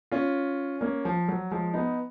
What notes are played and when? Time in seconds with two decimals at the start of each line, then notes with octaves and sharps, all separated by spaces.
0.11 C#4 F4
0.81 A#3 C#4
1.05 F3
1.28 F#3
1.51 F3 G#3
1.74 B3 D#4